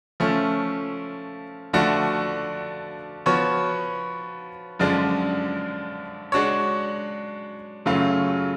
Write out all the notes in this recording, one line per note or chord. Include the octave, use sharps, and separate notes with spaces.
F3 A3 C#4
D3 F3 A3 D4 F#4
F3 B3 F#4 C#5
F#2 D3 F3 G#3 D4
G#3 D4 F#4 C#5
F#2 C#3 F#3 A3 F4